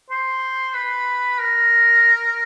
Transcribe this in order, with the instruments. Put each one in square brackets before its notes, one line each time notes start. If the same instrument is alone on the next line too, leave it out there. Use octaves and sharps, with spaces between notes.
[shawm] C5
B4
A#4